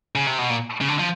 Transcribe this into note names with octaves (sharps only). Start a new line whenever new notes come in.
C#3
C3
B2
A#2
C#3
D3
F3